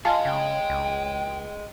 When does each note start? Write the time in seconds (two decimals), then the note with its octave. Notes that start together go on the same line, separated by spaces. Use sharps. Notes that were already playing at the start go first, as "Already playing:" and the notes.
0.05 F4 G#4 D#5 F5 G#5 A5
0.25 C#3 G5
0.69 C#2